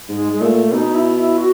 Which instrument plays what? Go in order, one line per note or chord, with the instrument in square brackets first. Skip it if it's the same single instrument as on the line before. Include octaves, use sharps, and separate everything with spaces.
[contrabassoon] G#2 [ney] G#3
[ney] G#3
[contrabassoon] A#2 [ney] A3
[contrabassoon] B2 [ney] D#4
[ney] E4
E4
F#4